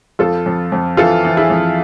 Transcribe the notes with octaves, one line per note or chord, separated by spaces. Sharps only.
F2 F4 A4
F2
F2
E3 F4 A4
E3
E4 G#4
F2